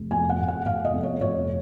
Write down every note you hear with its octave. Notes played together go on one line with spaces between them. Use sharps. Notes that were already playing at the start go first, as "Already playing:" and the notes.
Already playing: F1
F2 G#5
F#5
F1
F#5
F1 F5
D#5
F2
C#5
F1 C#5